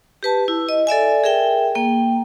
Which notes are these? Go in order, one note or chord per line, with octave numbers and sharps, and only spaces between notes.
G4 B4 A5
E4
D#5
A4 D5 E5 G#5
G#4 A#4 E5 G5
A#3 G5